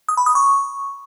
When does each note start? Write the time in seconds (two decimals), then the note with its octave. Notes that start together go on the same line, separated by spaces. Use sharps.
0.09 D#6
0.17 B5
0.26 D#6
0.35 C#6